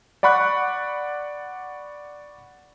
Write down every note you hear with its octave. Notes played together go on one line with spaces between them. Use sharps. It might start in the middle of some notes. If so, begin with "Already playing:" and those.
D5 F#5 B5 C#6 F#6